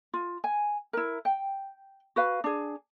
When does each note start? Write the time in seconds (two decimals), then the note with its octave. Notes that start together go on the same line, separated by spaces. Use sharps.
0.14 F4
0.44 G#5
0.93 E4 A#4
1.25 G5
2.16 F#4 B4 F5
2.44 D4 G#4